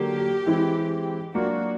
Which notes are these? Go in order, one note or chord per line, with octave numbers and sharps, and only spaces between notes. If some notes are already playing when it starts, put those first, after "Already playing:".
Already playing: D3 F#3 A#3 G4
E3 G#3 C4 E4
F#3 A#3 D4 F4 F#4